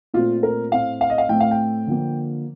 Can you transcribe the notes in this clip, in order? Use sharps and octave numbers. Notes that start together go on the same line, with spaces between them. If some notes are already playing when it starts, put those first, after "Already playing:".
A#2 A3 C4 F4
A#4
A2 A3 C4 F5
F5
D#5
F5
A2 A3 C4 G5
F5
G5
D3 F3 A#3